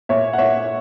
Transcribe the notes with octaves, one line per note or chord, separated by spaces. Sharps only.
A#2 C#5 E5
F#5
A#2 C#5 E5